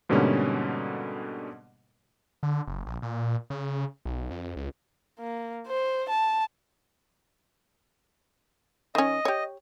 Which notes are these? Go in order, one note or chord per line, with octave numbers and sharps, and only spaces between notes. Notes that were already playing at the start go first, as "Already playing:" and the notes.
G#2 B2 D3 G3 A#3 C#4
D3
F#1
A#1
A#2
C#3
B1
F2
C#2
A#3
C5
A5
D#3 C#4 D#5
G4 C#5